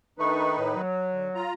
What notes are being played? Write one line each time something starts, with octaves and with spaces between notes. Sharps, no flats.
D#3 A3 D4 D#4 B4 C#6
A2
F#3
D3
F4 A#5